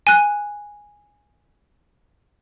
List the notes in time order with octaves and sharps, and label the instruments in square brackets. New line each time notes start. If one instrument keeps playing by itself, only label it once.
[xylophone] G#5 F#6